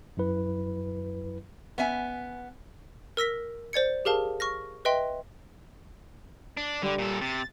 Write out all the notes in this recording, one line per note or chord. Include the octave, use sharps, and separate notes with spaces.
F#2 F#3 E4 B4
B3 C#4 E5 G#5
A#4 E6 A#6 B6
C5 D5 G#6 C#7
G4 G#4 A#4 F5 A5
C#6 F6 A#6
B4 D#5 E5 G5 C6
D4
D3 G3
A#2 A4
C3 A6